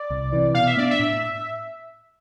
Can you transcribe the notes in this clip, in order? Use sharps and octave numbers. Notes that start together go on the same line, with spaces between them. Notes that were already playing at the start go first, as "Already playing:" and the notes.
Already playing: D5
C2
C3 E3
B2 F5
E5
B3 D4 D5
E5
A2